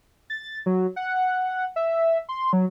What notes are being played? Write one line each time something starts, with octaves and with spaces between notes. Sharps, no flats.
A6
F#3
F#5
E5
C6
F#3